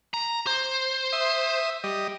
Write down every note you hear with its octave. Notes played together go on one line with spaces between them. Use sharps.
A#5
C5
E5 D#6
G3 D#5